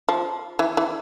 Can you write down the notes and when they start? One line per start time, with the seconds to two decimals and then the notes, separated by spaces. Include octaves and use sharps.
0.09 F3
0.59 E3
0.77 E3